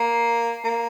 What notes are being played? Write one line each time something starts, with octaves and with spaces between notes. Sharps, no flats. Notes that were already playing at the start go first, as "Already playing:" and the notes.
Already playing: A#3
A#3